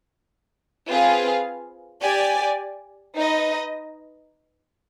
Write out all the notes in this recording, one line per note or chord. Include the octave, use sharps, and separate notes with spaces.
C4 F4 G#4 B4 F5
G4 D5 G#5
D#4 B4 D#5